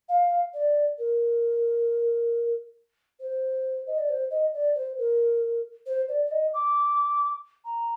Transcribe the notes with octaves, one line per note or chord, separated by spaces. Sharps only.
F5
D5
A#4
C5
D#5
D5
C5
D#5
D5
C5
A#4
C5
D5
D5
D#5
D6
A#5